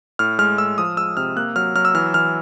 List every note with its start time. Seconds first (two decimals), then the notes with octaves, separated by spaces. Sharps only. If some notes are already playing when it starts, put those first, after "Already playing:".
0.19 A2 F6
0.39 G#3 F6
0.58 A2 E6
0.78 F3 D#6
0.97 G#3 E6
1.17 C3 F6
1.36 A#3 F#6
1.56 F#3 F6
1.75 F#3 F6
1.85 E6
1.95 E3 F6
2.14 E3 F6